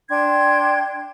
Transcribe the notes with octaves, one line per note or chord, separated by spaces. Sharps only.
D4 G5 C6 G#6